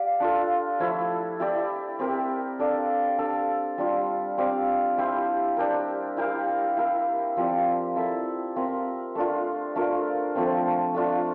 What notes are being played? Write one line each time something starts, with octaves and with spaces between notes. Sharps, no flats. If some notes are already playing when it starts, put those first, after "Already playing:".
Already playing: G4 D5 F5
D4 F4 A4
F3 A3 E4
E4 G4 D5
C4 G4 A#4 E5
D4 A4 D5 F5
D4 A4 D5 F5
G3 D4 F4
C4 G4 D5 F5
E4 G4 C5 F5
D4 G4 A#4
E4 G4 A#4 F5
E4 A#4 F5
F3 C4 G4 D5
E4 A4 E5
C4 F4 A#4 E5
A3 D4 F4
A3 D4 F4 A#4
F3 A3 C4
A3 D4 F4